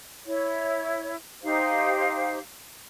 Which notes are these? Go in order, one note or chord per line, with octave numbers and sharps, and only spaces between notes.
E4 C#5
D#4 G4 C5 F5